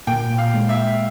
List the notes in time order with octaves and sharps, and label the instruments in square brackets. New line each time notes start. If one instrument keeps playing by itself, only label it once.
[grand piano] A#2 [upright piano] G5
[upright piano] F5
[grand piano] G#3
[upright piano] E5